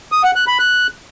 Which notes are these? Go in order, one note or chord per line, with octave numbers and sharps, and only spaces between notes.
D#6
F#5
F#6
B5
F#6